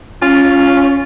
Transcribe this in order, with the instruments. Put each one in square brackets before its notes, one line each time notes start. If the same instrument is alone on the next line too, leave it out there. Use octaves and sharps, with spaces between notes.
[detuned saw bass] C#4 [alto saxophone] F4